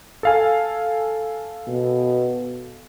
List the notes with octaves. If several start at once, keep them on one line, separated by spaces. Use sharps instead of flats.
A4 F5 G#5
B2